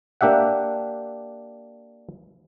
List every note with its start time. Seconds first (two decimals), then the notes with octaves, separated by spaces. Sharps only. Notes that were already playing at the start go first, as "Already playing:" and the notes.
0.21 A#3 D4 G4 E5 F#5